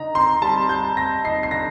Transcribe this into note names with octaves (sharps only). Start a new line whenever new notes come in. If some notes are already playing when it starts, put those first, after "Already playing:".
Already playing: D3 D#4 A#5
C4 C6
G3 A5
G3 G6
C4 A#6
D#4 C7
C7
D3 A#6